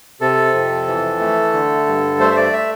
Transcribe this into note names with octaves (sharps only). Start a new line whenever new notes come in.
C3 A4
F2
E3
A3
D3
G2
A3 C5
E5
D5
E5